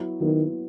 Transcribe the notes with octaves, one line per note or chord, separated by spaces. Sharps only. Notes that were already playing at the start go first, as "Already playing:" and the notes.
Already playing: F#3 B3 E4
D#3 F#3 B3 E4